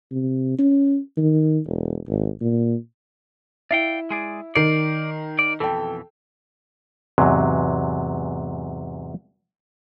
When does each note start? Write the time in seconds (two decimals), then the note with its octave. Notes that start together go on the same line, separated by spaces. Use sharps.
0.12 C3
0.58 C#4
1.17 D#3
1.66 E1
2.08 G#1
2.41 A#2
3.71 E4 D5 F5 G5
4.11 G#3 G#4 D5
4.55 D#3 D5 C7
5.39 D5
5.60 F2 B2 E3 A4 G5
7.18 E2 G#2 C3 F#3